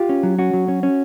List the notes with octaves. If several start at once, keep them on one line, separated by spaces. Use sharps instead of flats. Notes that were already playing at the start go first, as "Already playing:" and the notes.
Already playing: F4 G4
C#4
F#3
C#4 F#4
F#3
C#4
C#4